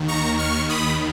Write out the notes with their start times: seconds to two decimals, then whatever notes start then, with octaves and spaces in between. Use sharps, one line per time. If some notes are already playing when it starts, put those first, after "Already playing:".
Already playing: D#2 D#3
0.08 A#5 C#6
0.38 C#6 F6
0.69 B5 D#6